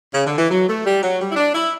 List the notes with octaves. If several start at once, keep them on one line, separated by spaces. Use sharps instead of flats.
C#3
D3
E3
F#3
A3
G3
F#3
G3
E4
D4
E4